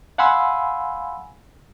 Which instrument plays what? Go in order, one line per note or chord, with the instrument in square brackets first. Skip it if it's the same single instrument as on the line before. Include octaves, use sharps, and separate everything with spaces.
[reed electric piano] F5 F#5 G#5 B5 C6 E6